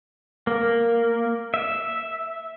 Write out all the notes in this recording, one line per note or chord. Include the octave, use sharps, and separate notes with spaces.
A#3
E5